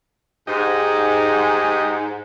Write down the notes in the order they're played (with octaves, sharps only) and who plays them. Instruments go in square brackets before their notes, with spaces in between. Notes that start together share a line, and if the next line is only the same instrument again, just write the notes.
[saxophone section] G#2 [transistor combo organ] G4 D#5